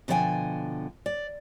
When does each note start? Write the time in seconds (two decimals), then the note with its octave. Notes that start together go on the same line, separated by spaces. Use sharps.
0.08 B2 D3 F3 C#5 G5 G#5
1.06 D5